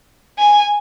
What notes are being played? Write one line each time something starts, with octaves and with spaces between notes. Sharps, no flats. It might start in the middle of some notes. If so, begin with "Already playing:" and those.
G#5